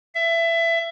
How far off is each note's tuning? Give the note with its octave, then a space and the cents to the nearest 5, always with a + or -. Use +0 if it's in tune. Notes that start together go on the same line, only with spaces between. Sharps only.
E5 +20